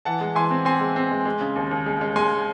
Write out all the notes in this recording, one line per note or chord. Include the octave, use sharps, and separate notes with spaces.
E3 F#5 A5
G#3
E3 G#5 C6
C4
C4 G#5 C6
G#3
C4
G#3
G#3
C#3
D#2
D#2
G#3
G#3
G#3 G#5 C6